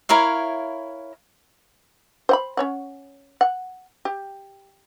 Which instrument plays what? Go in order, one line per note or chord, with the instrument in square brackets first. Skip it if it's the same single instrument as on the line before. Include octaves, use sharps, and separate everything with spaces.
[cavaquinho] E4 A#4 C#5 F5
[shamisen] C5 F#5 B5
C#4 C#5 F#5
F#5
G4